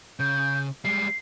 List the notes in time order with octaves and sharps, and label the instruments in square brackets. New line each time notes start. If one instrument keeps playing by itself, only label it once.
[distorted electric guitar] C#3 [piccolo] G6
[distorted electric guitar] G3 G#3 [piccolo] C7